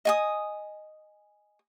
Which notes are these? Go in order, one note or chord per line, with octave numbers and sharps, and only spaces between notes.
D#5 G#5 D#6